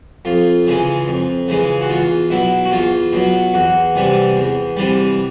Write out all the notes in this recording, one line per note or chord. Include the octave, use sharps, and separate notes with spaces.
F2 F4
C#3 E3 G#3
F2
C#3 E3 G#3
F#4
E2 F4
B2 F#3 E4
F#4
E2 F4
B2 F#3
E2 F#4
C3 E3 G3
E2
C3 E3 G3